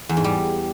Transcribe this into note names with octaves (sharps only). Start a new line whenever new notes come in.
E2
G#2
G3